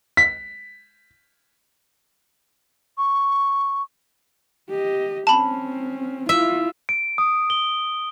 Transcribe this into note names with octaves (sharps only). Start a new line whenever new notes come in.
B6
C#6
G4 D#5
C4 C#4 A5 B5
E4 F4 E5
D7
D#6
G7